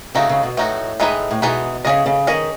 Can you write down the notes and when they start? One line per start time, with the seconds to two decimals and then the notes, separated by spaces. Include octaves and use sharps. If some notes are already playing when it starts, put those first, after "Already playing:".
0.15 C#3 A3 D#4 F#4
0.29 C#3
0.43 B2
0.57 A2 A3 D#4 F#4
1.00 A2 E3 G#3 D#4 G#4 B4
1.31 A2
1.42 B2 E3 G#3 D#4 G#4 B4
1.85 C#3 C#4 G#4 D#5
2.06 C#3
2.27 D#3 C#4 G#4 D#5